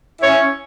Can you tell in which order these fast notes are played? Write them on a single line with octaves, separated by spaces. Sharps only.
E4 C#5 C#4